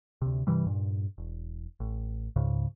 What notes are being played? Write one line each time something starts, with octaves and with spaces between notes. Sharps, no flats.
D2 C3
G2 C3 E3 G3
G2 A#2
E1
A1
C#2 G#2 C#3